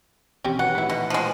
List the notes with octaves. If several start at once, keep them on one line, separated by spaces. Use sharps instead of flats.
B2 D#3 E3 C4 C#4 G4
B2 F#3 B4 C#5 F#5
A#2 A3 D#4 E4 B4
B2
F3 G#3